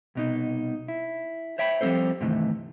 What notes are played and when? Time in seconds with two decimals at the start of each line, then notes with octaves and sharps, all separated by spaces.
0.15 C2 B2 D#4
0.88 E4
1.58 C5 C#5 E5 G5 A5 B5
1.81 F3 G3 A#3 C4 A4 C5
2.20 G2 C3 D#3 E3 A3